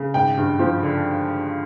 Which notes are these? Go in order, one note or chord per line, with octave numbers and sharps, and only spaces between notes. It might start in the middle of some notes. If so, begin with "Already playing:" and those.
Already playing: C#3
G#1 G5
G2
F3
D3